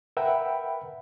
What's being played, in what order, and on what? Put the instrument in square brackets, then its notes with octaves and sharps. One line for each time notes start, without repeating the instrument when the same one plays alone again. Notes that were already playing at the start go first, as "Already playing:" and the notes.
[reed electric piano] A#4 B4 E5 F#5 G5 B5